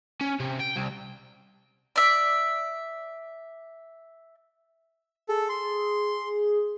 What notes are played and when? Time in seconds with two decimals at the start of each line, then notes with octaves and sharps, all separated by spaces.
0.21 C#4
0.40 C3
0.60 G5
0.76 C2
1.96 D5 E5
5.29 G#4 A4
5.49 C6